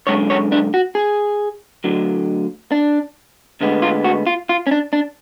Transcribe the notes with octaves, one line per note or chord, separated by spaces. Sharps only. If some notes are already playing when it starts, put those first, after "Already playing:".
F#2 D3 G#3 C#5
C#5
D4
F#4
G#4
D2 D3 F#3
D4
D2 D3 G#3 B3
F4
F#4
F4
F4
C#4
D4
D4